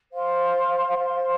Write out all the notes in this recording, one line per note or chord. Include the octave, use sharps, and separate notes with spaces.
C5 F5 C6
C5 F5 C6